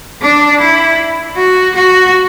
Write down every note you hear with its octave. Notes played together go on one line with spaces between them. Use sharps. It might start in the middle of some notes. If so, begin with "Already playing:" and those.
D4
E4
F#4
F#4